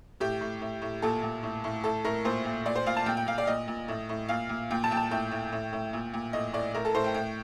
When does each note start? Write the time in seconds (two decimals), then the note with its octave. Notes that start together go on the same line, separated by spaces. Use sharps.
0.20 A2 G4
0.41 A2
0.61 A2
0.82 A2
1.02 A#2 A4
1.23 A#2
1.43 A2
1.64 A2
1.84 A2 A4
2.04 A2 A#4
2.24 A#2 C5
2.45 A#2
2.66 A#2 D5
2.75 C5
2.86 A#2 F5
2.97 A5
3.06 A#2 G5
3.17 G5
3.27 A#2 F5
3.38 D5
3.47 A#2 D#5
3.68 A#2
3.88 A2
4.09 A2
4.29 A#2 F5
4.49 A#2
4.70 A#2 G5
4.84 A5
4.91 A#2 G5
4.97 A5
5.11 A2 G5
5.31 A2
5.52 A2
5.73 A2
5.93 A#2
6.13 A#2
6.33 A2 D#5
6.53 A2 D5
6.74 A2 A#4
6.85 A4
6.94 A2 C5
7.04 G5
7.14 A2 G5